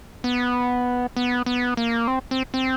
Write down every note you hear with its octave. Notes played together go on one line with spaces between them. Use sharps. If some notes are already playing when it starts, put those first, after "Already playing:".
B3
B3
B3
A#3
C4
C4
C4